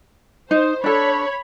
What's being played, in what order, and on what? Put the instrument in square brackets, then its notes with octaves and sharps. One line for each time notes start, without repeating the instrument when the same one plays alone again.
[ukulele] D#4 [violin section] C5
[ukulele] D4 A4 [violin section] C#5 B5